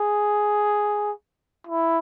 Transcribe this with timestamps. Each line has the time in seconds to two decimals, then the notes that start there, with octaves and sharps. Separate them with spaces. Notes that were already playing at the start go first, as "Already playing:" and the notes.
Already playing: G#4
1.67 E4